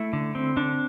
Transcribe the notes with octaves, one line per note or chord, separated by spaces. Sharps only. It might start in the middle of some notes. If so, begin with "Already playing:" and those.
Already playing: A3 E4
D3
C4
D3 D4